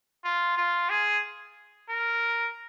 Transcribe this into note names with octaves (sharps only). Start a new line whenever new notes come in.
F4
F4
G#4
A#4